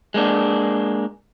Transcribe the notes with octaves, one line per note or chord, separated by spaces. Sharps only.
G#3 A#3 D4